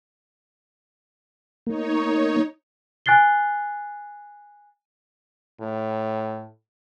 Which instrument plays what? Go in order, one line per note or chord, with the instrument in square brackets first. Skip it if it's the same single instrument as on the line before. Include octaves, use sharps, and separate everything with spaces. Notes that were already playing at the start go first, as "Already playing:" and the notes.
[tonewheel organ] A#3 [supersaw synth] D#4 C#5
[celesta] G#5 F#6 A6 C7 G7
[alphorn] A2